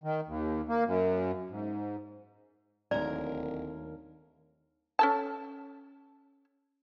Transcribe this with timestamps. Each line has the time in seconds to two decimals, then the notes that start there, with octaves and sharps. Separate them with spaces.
0.04 D#3
0.28 D#2
0.69 A#3
0.86 F#2
1.50 G#2
2.91 D1 D#2 A#4 D5
4.99 C#4 A4 A5